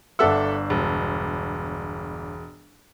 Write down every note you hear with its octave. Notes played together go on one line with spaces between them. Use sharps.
G1 D4 A4 E5 F#5 E6
E1